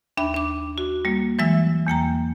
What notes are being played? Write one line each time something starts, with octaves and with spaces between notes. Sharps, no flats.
D#2 D4 E5 B5
D4 D6
F#4
G3 A#3
E3 F#3 G#3 E5 E6
E2 A#3 G5 A#5